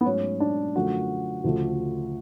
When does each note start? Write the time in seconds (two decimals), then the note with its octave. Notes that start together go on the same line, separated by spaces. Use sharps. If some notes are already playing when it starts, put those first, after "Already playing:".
0.01 B3
0.06 G#2 F#3 A3 C#4
0.40 D4
0.75 F#2 D3 F3 A3 F#4
1.44 D2 C#3 F3 A3